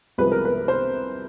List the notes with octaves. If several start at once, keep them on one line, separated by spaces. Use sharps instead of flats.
C2 C3 F3 G#3 B4
A#4
B4
C5